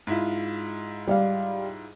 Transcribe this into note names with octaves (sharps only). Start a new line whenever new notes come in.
G#2 E4 F4
G3 D5 F5